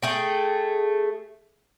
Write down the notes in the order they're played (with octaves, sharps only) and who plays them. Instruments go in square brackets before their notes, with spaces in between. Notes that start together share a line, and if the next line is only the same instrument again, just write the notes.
[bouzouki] A3 G#4 G5